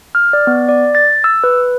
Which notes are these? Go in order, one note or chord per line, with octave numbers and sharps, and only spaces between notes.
F6
D5
B3
D5
A6
E6
B4